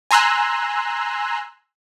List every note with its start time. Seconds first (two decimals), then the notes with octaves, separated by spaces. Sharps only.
0.11 G#5 A#5 C6 E6 F#6